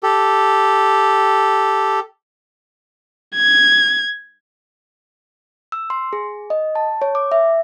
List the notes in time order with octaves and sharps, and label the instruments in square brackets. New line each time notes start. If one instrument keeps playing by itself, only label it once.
[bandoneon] G4 A4
[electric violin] G#6
[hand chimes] E6
C6
G#4
D#5
A5
C#5
D6
E5